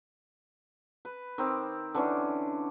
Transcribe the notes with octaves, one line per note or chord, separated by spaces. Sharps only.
B4
D#3 C4 D6
D3 E3 C#4 D4